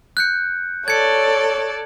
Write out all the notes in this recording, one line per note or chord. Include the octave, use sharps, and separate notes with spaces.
F#6 G6 C#7
A4 C#5 D5 G#6 C#7